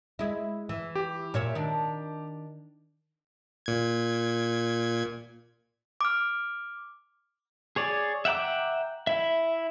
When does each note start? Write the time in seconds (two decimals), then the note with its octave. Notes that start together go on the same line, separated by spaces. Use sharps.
0.19 G#3 E4
0.69 E3
0.96 G4
1.34 A#2 C#5 E5
1.55 D#3 D4
3.66 A#2 G#6
6.01 D6 F6
7.76 G#4 C#5 D5
8.25 E5 F#5 G5 A#5 D6
9.07 E4 E5